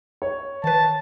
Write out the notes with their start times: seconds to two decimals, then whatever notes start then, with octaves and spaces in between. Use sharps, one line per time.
0.22 C#5
0.64 D#3 B4 A5